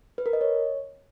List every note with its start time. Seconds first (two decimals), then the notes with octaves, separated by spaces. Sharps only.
0.18 B4
0.26 A#4
0.33 D#5
0.41 C#5